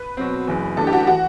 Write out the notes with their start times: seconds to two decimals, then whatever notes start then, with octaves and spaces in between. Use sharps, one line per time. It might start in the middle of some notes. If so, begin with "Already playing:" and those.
Already playing: B4
0.17 B2 F#3 C4
0.47 F#1 F#2 E3
0.77 A1 G2 E3 G3 D4 A4
0.87 G4
0.93 F#4
1.07 E3 F#4